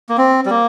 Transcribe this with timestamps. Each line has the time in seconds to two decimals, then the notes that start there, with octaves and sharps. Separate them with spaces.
0.09 A#3
0.18 C4
0.46 G3
0.50 A#3